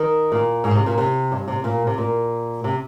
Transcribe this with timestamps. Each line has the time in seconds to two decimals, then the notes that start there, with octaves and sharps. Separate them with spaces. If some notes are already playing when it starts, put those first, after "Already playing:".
Already playing: D#3
0.32 A#2
0.64 G#2
0.75 C3
0.86 A#2
0.98 C3
1.32 G2
1.48 C3
1.64 A#2
1.87 C3
1.98 A#2
2.64 C3